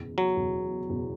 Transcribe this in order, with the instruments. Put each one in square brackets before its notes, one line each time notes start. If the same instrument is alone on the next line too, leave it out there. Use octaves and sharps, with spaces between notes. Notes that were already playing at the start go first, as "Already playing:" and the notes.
Already playing: [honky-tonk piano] F#1 E2 B2
[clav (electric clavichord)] F#3
[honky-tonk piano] F#1 E2 B2
F#1 E2 B2